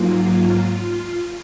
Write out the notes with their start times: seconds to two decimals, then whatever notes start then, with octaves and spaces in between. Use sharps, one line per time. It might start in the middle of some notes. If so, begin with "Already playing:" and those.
Already playing: G#2 F#3 A#3 F4